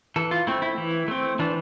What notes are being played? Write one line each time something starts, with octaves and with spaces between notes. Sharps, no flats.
E3 A4
F4
A3 C4 E4
E4
E3
A3 C4
E3 D4